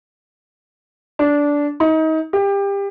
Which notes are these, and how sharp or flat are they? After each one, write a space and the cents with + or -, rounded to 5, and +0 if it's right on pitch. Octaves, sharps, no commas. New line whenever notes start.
D4 -15
D#4 +30
G4 +25